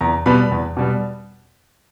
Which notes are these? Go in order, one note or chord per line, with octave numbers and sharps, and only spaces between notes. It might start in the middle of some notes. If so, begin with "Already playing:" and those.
E2 A#5
B2 G3 B3 B5
E2
B2 G3 B3